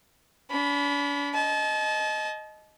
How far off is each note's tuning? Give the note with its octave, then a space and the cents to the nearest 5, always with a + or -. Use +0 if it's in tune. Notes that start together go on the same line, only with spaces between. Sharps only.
D4 -45 B5 +0
D#5 +0 A5 -35